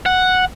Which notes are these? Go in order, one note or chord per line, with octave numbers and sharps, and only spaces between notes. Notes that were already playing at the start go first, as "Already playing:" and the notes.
F#5